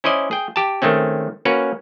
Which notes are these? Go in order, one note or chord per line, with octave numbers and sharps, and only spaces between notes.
C#4 E4 C5 D5 D#5
G#4 G5
G4 A5
D#3 G#3 A3 C4 C#4
A#3 C#4 F#4 A#4 B4